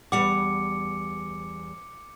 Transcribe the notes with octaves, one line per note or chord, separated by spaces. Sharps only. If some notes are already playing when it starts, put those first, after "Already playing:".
E2 G3 F#5 D6 C#7